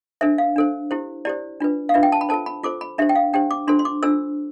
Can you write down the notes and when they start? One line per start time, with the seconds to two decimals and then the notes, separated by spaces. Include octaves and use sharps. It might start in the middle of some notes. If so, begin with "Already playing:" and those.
0.21 D4 A4 C5 E5
0.38 F5
0.56 D4 A4 C5
0.91 E4 G4 C5
1.25 E4 G4 C5 D5
1.60 D4 F4 B4
1.89 F5
1.94 D4 F4 B4 E5
2.03 G5
2.12 A5
2.21 B5
2.29 F4 A4 C5 A5
2.46 B5
2.63 F4 A4 C5 D6
2.81 B5
2.98 D4 G4 C5 E5
3.09 G5
3.15 F5
3.33 D4 G4 C5 G5
3.51 D6
3.68 D4 F4 A4 C5 C6
3.79 C6
3.85 D6
4.03 D4 F4 A4 C5 E6